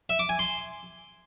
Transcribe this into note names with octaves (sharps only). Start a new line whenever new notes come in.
E5
D6
G#5
C6